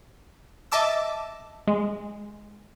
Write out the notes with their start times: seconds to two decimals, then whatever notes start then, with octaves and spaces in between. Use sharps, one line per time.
0.72 D#5 E5 A5 D6 E6
1.68 G#3